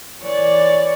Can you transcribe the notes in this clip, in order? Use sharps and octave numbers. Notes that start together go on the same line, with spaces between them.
E3 C#5 D5